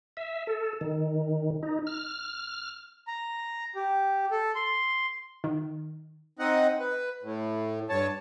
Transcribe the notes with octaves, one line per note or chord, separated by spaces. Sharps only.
E5
A4
D#3
D#4
F6
A#5
G4
A4
C6
D#3
C4 D#4 D#5 F#5
B4
A2
G2 C#5 A5